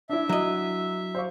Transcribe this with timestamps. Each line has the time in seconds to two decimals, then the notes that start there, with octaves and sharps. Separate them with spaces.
0.10 D4 E4 E5
0.29 F#3 D#5
1.15 C5 F5 C#6